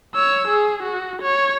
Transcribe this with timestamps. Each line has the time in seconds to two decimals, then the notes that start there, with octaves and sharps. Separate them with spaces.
0.15 C#5 E6
0.48 G#4
0.83 F#4
1.22 C#5